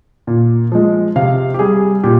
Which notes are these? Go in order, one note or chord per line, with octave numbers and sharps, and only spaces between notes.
A#2
F3 G#3
C3 F5
G4
G3 G#4
A#2 G4